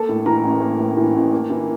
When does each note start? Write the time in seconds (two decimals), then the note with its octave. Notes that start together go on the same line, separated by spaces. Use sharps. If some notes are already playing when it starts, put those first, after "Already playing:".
Already playing: A#3 A4 A5
0.09 A2
0.26 E3 A#4 A#5
0.44 A1
0.62 A#3
0.79 A2
0.97 E3
1.14 A1
1.32 A#3
1.50 E3